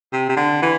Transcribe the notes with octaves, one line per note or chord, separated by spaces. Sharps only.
C3
C3
D3
E3